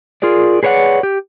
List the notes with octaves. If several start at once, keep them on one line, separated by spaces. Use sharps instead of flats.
F4 G#4 A#4 D5
G#4 B4 C#5 D5 F#5
G4